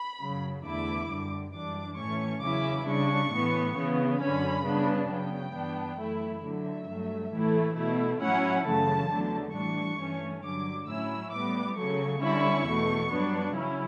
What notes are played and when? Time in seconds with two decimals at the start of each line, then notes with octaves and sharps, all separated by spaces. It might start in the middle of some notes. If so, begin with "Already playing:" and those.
Already playing: B5
0.21 F#2 C#3 F#3
0.65 E2 D3 A3 E4 D6
1.10 F#2 D3 G3
1.54 F#2 E3 G3 D4 D6
1.98 A2 E3 A3 C#4 C#6
2.42 E2 C#3 F#3 C#4 E4 D6
2.87 C#3 G3 D4 C#6
3.32 A2 E3 B3
3.76 C#3 E3 B3
4.20 F#2 D3 F#3 C#4 B5
4.65 C#3 G3 B3 D4
5.09 C#3 F#3 B3 G5
5.54 G2 E3 B3 D4
5.98 F#2 E3 A3 E4
6.43 D3 F#3 A3 E5
6.88 G2 F#3 A3
7.32 A2 E3 A3 E4
7.76 B2 A3 E4
8.21 A2 F#3 C#4 E4 F#5
8.65 F#2 C#3 E3 A3 A5
9.10 E2 D3 F#3 A3
9.54 A2 E3 G3 D4 C#6
9.99 G2 E3 A3 C#4
10.43 G2 D3 F#3 D6
10.87 A2 F#3 C#4 E4 E6
11.32 A2 G3 B3 D6
11.76 C#3 F#3 A3 C#6
12.21 D3 G3 C#4 E4 C#6
12.65 E2 B2 A3
13.10 G2 F#3 B3 D4
13.54 C#3 F#3 C#4 E4